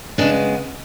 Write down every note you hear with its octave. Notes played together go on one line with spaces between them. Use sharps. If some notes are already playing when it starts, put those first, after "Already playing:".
C#3 G#3 B3 D4